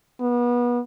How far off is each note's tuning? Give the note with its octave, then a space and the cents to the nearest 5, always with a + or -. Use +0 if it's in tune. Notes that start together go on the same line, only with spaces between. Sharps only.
B3 -30